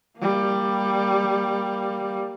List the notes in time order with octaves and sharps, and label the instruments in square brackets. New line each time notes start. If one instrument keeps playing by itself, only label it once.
[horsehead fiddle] G3 A#3